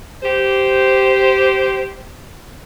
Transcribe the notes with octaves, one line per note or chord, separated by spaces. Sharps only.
G4 C5